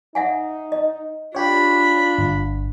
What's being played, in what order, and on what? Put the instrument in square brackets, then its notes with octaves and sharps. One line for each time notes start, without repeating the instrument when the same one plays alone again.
[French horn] D#4 [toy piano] E5 F#5 G#5
[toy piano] D#5
[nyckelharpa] D4 B5 [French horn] F4 [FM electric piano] G4 C#5
[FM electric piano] G1